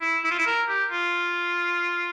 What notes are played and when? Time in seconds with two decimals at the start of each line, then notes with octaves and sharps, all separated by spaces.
0.01 E4
0.24 E4
0.31 F4
0.39 E4
0.47 A#4
0.68 G4
0.91 F4